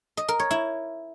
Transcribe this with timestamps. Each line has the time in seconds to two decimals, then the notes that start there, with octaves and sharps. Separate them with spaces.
0.17 D#5
0.28 A#4
0.40 C#5
0.51 E4